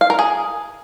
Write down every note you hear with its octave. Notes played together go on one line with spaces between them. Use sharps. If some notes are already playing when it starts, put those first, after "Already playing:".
F5
A#4
G#4